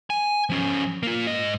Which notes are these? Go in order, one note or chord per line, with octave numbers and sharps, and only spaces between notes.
G#5
F3 C#4
A#3 F4
G#2 D#5